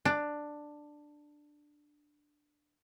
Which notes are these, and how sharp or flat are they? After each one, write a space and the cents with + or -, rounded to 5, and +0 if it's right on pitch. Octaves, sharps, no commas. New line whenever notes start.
D4 +10